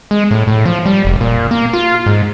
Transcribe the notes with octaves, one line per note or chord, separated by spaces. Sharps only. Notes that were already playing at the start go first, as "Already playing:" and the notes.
G#3
A2
A2
F3
G3
F1
A#2
A#3
F4
G#2